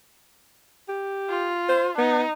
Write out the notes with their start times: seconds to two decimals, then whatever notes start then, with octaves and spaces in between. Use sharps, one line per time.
0.89 G4
1.29 F4
1.69 C5
1.98 B3 D#4